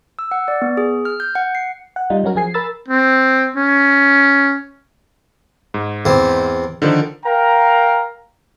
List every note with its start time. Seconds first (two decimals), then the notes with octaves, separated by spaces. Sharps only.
0.19 E6
0.31 F#5
0.48 D5
0.62 B3
0.77 G#4
1.05 F6
1.20 G6
1.35 F#5
1.55 C7
1.96 F#5
2.10 G3 D#4 F4
2.24 F#3 C#4 F#4 A#4
2.35 F3 G#4 G#5 C7
2.54 A#4 B5 E6 A6
2.88 C4
3.56 C#4
5.74 G#2
6.05 E2 C4
6.82 D3 D#3 F3
7.25 A#4 F5 G5 A#5